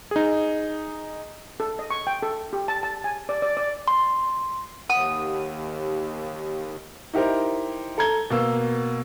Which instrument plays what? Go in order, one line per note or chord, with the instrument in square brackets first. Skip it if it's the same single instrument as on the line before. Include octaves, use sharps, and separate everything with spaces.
[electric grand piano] D#4 G#4
[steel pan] A4
D#5
C#6
G5
A4
G4
A5
A5
G#5
D5
D5
D5
[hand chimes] C6
[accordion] D#2 [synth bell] F#5 [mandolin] D#6
[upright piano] D#4 E4 G4 A#4 C5
A4 A#5 G#6 G7
B2 A#3 E6